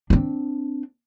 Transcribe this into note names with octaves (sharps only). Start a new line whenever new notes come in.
C4 D4